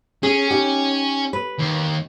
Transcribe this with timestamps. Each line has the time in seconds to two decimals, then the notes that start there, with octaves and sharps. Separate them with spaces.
0.23 C#4 G#4
0.50 D#4 G4
1.33 B4
1.59 D#2